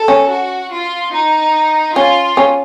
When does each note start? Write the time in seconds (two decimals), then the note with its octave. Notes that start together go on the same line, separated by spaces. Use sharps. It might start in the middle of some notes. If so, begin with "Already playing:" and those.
Already playing: A4
0.08 C#4
0.29 F#4
0.71 F4
1.12 D#4
1.95 C#4 F4
2.37 C#4